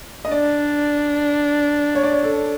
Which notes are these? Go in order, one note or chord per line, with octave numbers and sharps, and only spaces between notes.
D#5
D4 D5
C#5
D5
C#5
A4